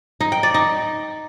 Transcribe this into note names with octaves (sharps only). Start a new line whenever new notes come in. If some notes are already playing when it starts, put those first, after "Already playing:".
D#4
G5
D5
D#4